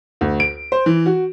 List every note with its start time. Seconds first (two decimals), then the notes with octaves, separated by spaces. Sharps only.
0.21 D2
0.40 D7
0.72 C5
0.86 E3
1.06 F#4